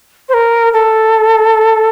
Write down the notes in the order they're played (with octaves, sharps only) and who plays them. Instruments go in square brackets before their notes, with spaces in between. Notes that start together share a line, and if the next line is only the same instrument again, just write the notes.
[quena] C5
A#4
A4